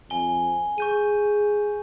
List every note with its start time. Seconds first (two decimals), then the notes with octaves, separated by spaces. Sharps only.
0.10 F2 G#5 G7
0.78 G#4 C#6 G6 D#7